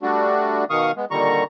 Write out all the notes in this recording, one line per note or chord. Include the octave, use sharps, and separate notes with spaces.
G3 A3 D4 F#4
B2 D#3 F5 C#6 D#6
G#3 B3
A#2 D3 D#3 G3 A#5 C#6